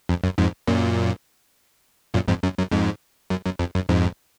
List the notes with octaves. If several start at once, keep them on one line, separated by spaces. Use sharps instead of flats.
F2
F#2
F2 G#2
F#2 A#2
F#2 A#2
F2 G#2
F#2
F#2
F2 G#2
F#2
F#2
F2
F#2
F2 G#2